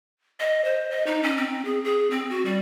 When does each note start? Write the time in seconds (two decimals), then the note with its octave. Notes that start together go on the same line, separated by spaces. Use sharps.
0.40 D#5
0.64 C5
0.90 D#5
1.06 D#4
1.23 C#4
1.37 C4
1.65 G#4
1.84 G#4
2.11 C4
2.30 F#4
2.45 G3